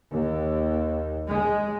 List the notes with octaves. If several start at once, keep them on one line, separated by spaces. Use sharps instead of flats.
D#2
G#3